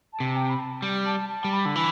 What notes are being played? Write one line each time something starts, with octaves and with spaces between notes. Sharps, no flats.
A5
C3
G5
B5
A5
G3
A5
A5
G3
B5
D3
E3